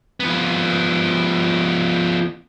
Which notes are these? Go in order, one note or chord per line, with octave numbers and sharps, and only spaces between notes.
F3 B3